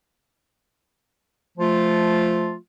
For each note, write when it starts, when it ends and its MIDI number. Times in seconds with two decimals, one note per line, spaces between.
1.58 2.55 53
1.58 2.55 57
1.58 2.55 65